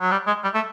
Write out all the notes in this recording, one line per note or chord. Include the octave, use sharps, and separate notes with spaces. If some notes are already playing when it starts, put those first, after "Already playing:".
F#3
G3
G#3
G3
A3